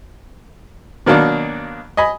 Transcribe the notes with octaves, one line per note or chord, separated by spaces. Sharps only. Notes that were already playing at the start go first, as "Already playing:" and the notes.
B2 D#3 F#3 A#3 D4
D#5 G#5 B5